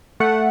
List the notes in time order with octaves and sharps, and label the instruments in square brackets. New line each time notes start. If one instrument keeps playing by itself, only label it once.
[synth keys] A3 F#5